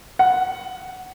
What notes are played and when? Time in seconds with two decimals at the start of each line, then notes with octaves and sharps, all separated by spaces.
0.19 F#5